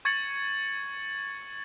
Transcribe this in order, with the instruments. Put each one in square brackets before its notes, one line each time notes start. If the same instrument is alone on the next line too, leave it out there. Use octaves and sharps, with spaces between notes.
[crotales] C#6 G#6 A6 C#7 F#7